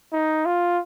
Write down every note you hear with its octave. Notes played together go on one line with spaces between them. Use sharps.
D#4
F4